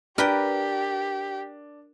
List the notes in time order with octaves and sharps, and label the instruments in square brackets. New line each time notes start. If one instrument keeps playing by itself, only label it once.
[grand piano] D4 [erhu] G4 [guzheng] A#4 B4 G5